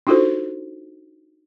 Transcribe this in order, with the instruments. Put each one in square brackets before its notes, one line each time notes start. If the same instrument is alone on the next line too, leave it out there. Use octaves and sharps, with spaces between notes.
[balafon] D4 D#4 F4 F#4 A4 C5